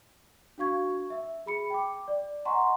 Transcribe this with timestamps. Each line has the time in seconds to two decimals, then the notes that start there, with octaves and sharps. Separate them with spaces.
0.58 D4 F#4 F5 C#6 G#6
1.10 E5
1.46 G#4 B5 C#7
1.70 G5 D6
2.08 D5
2.45 D#5 F#5 G#5 A#5 C6 C#6